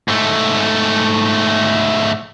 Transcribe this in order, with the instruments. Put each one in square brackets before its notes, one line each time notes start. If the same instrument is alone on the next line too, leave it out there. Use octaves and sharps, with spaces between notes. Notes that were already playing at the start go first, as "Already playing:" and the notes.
[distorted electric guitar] G#2 A3